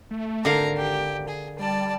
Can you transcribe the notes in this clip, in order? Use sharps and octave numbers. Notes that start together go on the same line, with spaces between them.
A3
G#1 D3 A3 A#4 F5 A#5
G4
G#4
G3 D5 A5